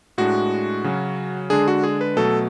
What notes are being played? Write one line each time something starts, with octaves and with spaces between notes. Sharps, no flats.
A2 G#3 D4 F#4
C#3 F#3 C#4
D3 G#3 D4 G#4
F#4
G#4
B4
B2 F#3 A3 A4